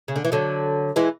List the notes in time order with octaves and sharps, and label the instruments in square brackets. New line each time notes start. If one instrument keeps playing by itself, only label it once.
[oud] C#3
D3
E3
D3 F#3
E3 G#3